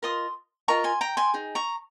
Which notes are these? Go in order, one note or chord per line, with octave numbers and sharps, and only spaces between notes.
F4 A#4 D#5 C6 D#6
F4 A#4 D#5 A#5 C#6
G#5 C6
G5 A#5
G#5 C6
D#4 G#4
A#5 C#6